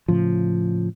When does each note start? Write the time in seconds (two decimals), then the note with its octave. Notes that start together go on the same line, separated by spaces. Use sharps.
0.08 A2 C#3 F3